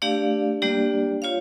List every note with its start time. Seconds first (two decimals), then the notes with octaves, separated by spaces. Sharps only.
0.02 A3 D4 G4 D5 F5
0.62 G3 A#3 D4 G4 D5
1.22 F4 C#5 F5